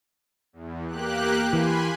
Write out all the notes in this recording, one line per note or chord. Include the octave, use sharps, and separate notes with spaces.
E2
A#3 G4 F#6
E3 G#5 B5 C6